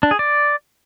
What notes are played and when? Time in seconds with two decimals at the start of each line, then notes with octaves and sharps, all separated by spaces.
0.03 D4
0.11 G#4
0.19 D5